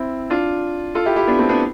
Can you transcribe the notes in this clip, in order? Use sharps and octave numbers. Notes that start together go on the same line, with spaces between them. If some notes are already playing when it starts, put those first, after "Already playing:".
Already playing: C4 E4
D4 F4
F4 A4
E4 G4
E4 G4
B3 D4
A3 C4
B3 D4